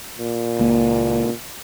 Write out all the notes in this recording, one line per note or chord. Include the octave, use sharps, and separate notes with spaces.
A#2
C#2 A#3